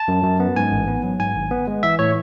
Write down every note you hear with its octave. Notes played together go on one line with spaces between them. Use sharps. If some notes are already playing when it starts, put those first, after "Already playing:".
Already playing: A5
F#2
F#2
B3
G#2 G#5
A1
B3
F#3
G#2 G#5
G#1
B3
G#3
E3 E5
A2 C#5